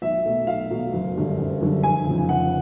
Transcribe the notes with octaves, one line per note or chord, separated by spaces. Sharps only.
B1 E5
B2 F#3 A3
B1 F5
B2 F#3 A3
F#1
F#2 D3 G3
F#1
F#2 D3 G3
F1 G#5
F2 C#3
F1 F#5